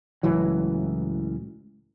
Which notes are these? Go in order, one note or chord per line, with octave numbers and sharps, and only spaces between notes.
C#2 A2 E3 F#3